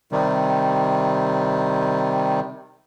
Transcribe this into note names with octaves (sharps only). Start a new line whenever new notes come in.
C3 D#3 G3